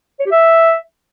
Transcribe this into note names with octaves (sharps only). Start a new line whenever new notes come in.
C#5
G4
E5